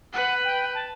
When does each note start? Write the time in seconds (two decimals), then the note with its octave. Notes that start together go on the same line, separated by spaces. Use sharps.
0.13 B4 F#5
0.44 G5
0.74 A5